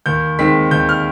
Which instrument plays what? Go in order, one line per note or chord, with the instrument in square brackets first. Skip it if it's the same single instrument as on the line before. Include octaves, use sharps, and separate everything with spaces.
[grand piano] D#2 G6
D#3 G#3 C4 B6
D#2 G6
F6